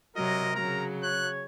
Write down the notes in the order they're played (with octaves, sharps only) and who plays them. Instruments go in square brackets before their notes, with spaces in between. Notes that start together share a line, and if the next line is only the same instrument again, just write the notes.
[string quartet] C3 F#3 [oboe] A#4 [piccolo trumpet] D#5
[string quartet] C#3 F#3 [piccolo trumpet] A#5
[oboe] C#5 [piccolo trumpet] F#6